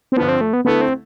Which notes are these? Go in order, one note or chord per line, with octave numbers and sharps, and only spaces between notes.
C4
G2 D3 F3 B3
C4
A3
B3
D3 A3 B3 E4 A4
C4